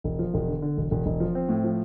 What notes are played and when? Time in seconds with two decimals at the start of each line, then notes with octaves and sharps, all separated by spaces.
0.04 E1
0.19 F3
0.34 E1
0.48 D3
0.62 D3
0.77 E1
0.91 E1
1.06 E1
1.20 F3
1.35 C4
1.49 A2
1.64 F3